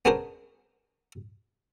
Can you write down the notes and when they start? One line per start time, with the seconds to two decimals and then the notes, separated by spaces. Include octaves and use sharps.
0.05 B3 C#4 D4 G#4 A#4 C5